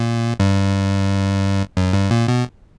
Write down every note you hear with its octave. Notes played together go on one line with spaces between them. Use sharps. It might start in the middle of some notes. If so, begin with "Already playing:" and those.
Already playing: A#2
G2
F#2
G2
A#2
B2